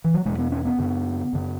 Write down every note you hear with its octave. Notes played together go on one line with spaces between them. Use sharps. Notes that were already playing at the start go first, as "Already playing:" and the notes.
E3
F#3
E2 B2 G#3
B3
C#4
B3
F#2 C#3
F#2 C#3